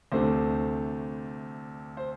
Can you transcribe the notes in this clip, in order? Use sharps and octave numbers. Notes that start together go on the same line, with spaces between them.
D2 C3 A3 D4 C5
C5